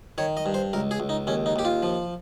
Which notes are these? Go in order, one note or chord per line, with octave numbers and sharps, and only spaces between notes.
D#3 C#5
D#5
G2
C5
C#2 A#4
G#4
C#2
D#4
D#2 C#4
D#4
D#2 G4
F4
F3